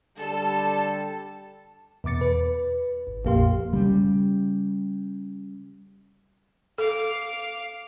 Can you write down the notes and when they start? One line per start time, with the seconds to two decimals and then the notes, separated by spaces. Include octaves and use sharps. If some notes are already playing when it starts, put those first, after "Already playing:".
0.17 D3 G3 A4
2.04 E2 B2 D6 A6 C#7
2.21 B4
3.07 G#1
3.25 A#1 F2 A#3 G4 F5 C6
3.73 C#3 G3
6.78 A4 F5 D6